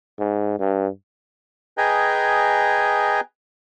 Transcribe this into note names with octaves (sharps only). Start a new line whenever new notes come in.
G#2
G2
G#4 B4 D#5 G5 G#5 A#5